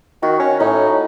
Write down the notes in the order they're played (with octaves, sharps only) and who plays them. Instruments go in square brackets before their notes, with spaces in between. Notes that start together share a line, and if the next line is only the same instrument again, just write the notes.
[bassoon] D#3 [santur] F#4
[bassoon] C#4
[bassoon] A2 [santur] D#4